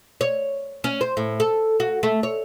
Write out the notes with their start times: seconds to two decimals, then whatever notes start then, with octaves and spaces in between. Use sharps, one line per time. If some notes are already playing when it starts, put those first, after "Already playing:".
0.21 C#5
0.84 C#4
1.01 C5
1.17 A2
1.40 A4
1.80 F#4
2.03 A3
2.23 C#5